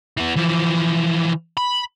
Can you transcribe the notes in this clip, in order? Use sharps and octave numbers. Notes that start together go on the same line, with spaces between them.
E3 B3
E3 F3
B5